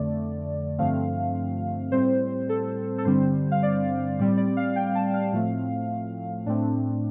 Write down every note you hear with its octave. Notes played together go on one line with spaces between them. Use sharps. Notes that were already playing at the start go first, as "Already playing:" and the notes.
Already playing: F2 D3 A3 D5
G2 D3 F3 A3 C4 F5
A2 G3 C4 C5
A4
A4
G2 D3 G3 C4 C5
F5
D5
A2 G3 C4 D5
D5
F5
G5
A5
F5
A2 F3 A3 C4
A2 A3 C4 D4